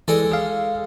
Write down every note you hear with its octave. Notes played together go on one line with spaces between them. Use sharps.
E3 G#3 A4 D5
G#4 F5